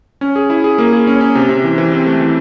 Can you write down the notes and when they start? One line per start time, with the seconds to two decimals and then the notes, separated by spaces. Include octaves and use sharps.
0.21 C#4
0.36 G#4
0.50 E4
0.64 G#4
0.78 A#3
0.93 G#4
1.07 C#4
1.21 C#4
1.35 C3
1.49 C3
1.64 E3
1.78 E3
1.92 C4
2.06 A3
2.20 E3